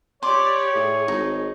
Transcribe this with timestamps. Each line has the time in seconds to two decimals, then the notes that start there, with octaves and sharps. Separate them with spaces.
0.23 G4 C#5 D5 C6 D6
0.75 A2 G#4
1.08 G#1 D#4